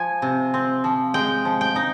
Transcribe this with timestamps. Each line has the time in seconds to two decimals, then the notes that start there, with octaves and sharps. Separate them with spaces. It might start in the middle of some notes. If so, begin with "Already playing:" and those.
Already playing: F3 G#5
0.22 C3
0.54 C4
0.84 F3
1.14 G#3 G5
1.45 F3
1.61 G5
1.76 D#4